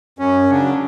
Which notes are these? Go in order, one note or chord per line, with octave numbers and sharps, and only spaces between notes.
F#2 C#4
C#3 F#3 D4